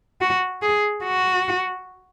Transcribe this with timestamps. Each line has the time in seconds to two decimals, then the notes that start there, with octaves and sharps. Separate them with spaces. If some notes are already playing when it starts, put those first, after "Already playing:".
0.21 F#4
0.62 G#4
1.04 F#4